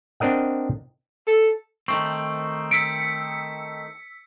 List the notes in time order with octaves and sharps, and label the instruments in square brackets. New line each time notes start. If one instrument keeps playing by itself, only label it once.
[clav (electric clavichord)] C4 D4 A#4 D#5 F#5
[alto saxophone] A4
[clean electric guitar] D#3 A3 C4 [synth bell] C#6
[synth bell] E6 B6 C#7 [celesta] D7